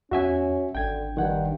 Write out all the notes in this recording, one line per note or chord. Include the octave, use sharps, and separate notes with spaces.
E2 C#4 F#4 E5 G#5
G#1 D3 G5 G#6
G2 D#3 F#5 G5